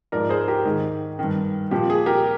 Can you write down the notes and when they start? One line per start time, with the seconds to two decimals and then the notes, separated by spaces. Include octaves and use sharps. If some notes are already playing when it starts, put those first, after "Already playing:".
0.12 G#2 F3 A#4 D5
0.29 G#4 C5
0.48 G4 A#4
0.65 G#2 D#3 G#4
1.19 G2 D#3
1.71 A#2 F3 G4
1.90 G#4
2.06 G4 A#4